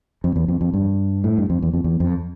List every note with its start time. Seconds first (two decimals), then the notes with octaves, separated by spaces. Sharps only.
0.24 F2
0.36 E2
0.48 F2
0.61 F2
0.74 G2
1.24 A2
1.38 G2
1.50 F2
1.62 E2
1.73 F2
1.84 E2
2.00 F2